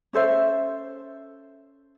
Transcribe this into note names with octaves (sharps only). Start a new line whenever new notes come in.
C#4 A4 C5 E5